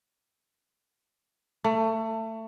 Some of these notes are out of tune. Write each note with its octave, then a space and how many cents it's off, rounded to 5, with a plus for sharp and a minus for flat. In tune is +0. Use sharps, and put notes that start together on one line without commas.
A3 +25